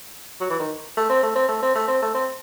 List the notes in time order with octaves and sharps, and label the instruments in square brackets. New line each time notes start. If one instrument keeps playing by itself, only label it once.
[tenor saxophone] F#3
E3
D#3
A3
C4
A3
C4
A3
C4
A3
C4
A3
C4